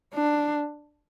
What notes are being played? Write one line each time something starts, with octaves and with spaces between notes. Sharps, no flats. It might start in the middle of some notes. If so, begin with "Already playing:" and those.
D4